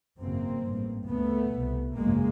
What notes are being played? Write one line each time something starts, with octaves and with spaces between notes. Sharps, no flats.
G#1 F#2 C#3 A#3 C4
A1 G2
D2 C#3 A3 B3
C2 B2
G#1 F#2 C#3 G#3 A#3